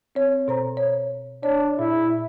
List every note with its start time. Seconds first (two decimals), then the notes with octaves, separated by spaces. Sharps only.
0.15 C4 C#5
0.48 B2 C5 A#5
0.77 C#5
1.43 D4 C#5
1.79 A#2 E4